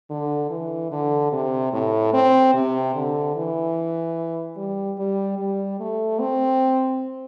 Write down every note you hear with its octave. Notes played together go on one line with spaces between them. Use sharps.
D3
E3
D3
C3
A2
C4
C3
D3
E3
G3
G3
G3
A3
C4